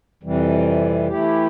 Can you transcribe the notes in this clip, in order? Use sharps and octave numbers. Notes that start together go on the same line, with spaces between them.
F2 C3 E3 G3
E3 A3 E4 G4